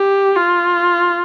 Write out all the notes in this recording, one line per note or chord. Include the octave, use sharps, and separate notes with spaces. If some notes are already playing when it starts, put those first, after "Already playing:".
Already playing: G4
F4